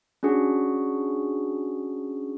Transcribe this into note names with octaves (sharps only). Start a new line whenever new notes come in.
C#4 D4 F#4 G#4